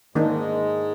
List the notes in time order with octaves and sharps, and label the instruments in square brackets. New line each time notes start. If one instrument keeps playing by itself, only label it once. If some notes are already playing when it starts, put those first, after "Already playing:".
[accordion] G#2 G#3 [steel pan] D#3 A#3 D4